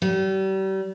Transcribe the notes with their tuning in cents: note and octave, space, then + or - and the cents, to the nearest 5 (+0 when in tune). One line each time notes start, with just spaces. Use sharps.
G3 -35